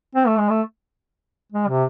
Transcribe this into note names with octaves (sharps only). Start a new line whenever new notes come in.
C4
A3
G#3
A3
G#3
C3